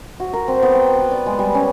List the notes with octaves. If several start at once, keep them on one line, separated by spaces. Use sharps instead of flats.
F#4
A#4
C4
B3
G5
B4
D5
G#3
G3
C#4